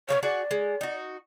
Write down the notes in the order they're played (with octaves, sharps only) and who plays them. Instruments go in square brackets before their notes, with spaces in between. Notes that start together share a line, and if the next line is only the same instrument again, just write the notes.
[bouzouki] B2 F3 F5 [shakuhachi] C#5
[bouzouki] F#4 G#4 F#5 [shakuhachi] D5
[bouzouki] G#3
D#4 F#4